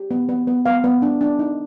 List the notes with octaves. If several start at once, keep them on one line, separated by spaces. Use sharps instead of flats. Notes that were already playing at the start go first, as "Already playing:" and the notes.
Already playing: G4
B3
B3
B3
B3 F5
B3
D4
D4
D#4